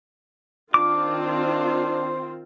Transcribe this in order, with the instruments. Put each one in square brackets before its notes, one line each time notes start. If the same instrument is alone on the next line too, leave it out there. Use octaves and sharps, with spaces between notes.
[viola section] D#3 C4 F4 [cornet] D4 [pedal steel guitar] D6
[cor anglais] C5